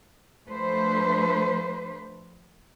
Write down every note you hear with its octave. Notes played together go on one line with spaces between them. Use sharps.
F3 A3 D4 B4 C5